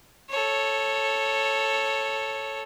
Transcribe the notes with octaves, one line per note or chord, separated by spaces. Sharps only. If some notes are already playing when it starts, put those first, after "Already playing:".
A4 C#5